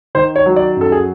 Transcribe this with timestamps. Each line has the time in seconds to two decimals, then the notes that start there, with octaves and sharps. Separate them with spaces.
0.15 D#3 C5
0.36 C#5
0.46 F#3
0.56 D5
0.76 F#2 A4
0.92 G#4